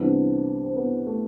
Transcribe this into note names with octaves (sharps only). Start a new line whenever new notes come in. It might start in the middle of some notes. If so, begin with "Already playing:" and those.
Already playing: C2 C3 E3 B3 D4
C4
B3
A3